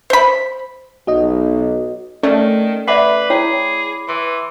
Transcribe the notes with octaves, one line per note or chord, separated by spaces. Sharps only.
C5 B5
B1 F#4 D#5
D#3 A3 C#4 D5
B4 D5 E5 F#5 B5 D6 C7
E4 G#4 C#5 G5
E3 C6